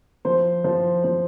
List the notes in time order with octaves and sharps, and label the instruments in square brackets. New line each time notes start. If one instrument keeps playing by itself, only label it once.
[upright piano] F3 C5
F3
F3